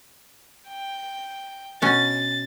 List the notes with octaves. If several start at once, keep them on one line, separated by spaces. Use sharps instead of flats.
G5
B2 C#4 A6